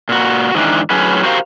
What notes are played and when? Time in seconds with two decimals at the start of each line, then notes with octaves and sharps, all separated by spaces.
0.09 A#2 F#4
0.54 G#2 D#3 E3 D4
0.90 A2 D3 F#3 C#4 G#4 B4
1.23 F#4 G4 A#4 C5 F5